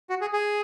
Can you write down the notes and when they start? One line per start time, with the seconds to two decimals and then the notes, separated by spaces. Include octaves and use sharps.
0.10 F#4
0.21 G#4
0.33 G#4